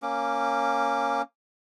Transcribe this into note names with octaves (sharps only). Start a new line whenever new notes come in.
A#3 C#4 D6